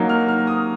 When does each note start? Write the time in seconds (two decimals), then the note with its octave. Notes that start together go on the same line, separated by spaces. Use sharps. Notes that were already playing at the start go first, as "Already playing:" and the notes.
Already playing: F#3 A#3 D#4
0.09 F6
0.28 F6
0.47 D#6